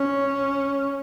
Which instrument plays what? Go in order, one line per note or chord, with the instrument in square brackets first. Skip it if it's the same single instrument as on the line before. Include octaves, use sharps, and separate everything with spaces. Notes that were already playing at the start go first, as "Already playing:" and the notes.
Already playing: [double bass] C#4